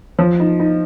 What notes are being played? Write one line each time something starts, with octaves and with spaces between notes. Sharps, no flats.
F3
D#4
D#4